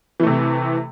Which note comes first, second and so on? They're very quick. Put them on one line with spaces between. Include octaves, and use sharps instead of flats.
E3 A3 C3